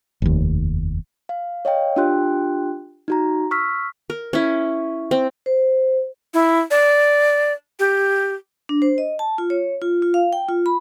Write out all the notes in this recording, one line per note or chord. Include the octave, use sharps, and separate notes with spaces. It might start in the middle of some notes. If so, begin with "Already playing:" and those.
F1 D#2
F5
C#5 D#5 F5 G5
D4 F4 G4 G5 C6 F#6
D#4 F#4 A#5
C#6 E6 F6 B6
A#4
C#4 E4
C4
C5
E4
D5
G4
D4
C5
D#5
A5
F4
C#5
F4
F4
F5
G5
F4
B5